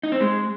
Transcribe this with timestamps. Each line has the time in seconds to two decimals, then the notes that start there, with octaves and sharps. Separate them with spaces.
0.03 D#4
0.12 C4
0.21 G#3